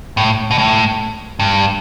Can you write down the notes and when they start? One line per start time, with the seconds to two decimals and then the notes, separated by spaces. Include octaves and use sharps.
0.17 A2
0.51 B2
0.58 A2
1.39 G2